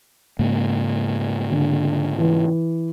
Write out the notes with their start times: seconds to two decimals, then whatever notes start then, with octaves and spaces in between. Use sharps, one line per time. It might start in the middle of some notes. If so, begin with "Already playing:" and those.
0.39 G#2 C#3 A#3
1.51 D3
2.18 E3